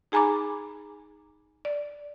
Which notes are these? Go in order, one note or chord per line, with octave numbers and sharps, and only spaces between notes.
D#4 G#4 G#5 A#5 B5 D6
D5